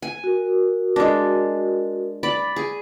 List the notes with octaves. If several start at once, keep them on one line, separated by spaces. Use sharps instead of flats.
G#5
F#4 A#4
G#3 D4
D5 B5
G#4